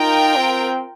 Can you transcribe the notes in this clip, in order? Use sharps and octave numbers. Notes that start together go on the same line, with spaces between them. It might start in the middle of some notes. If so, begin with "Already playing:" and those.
Already playing: D#4 F4 A#4 G5
C4